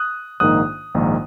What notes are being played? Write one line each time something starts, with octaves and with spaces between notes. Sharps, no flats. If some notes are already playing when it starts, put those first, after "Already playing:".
Already playing: D#6 F#6
A#1 G#2 D#3 A#3 D#4 D#6 F#6
A#1 G#2 D#3 A#3 D#4